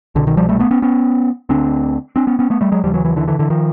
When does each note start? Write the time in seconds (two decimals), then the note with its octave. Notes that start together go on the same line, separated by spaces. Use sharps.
0.15 C2 D3
0.19 B2
0.27 D#3
0.37 F3 G3
0.49 G3 A3
0.59 A3 B3
0.71 B3 C#4
0.82 B3 C#4
1.49 D2 D3 C4 D4
2.16 C4 D4
2.27 B3 C#4
2.39 B3 C#4
2.50 A3 B3
2.61 G3 A3
2.72 F#3 G#3
2.84 D#2 C#3 F3 G3
2.94 E3 F#3
3.05 E3 F#3
3.16 D3 E3
3.28 D3 E3
3.39 D3 E3
3.50 D#3 F3